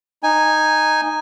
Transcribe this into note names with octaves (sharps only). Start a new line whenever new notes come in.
D#4 G#5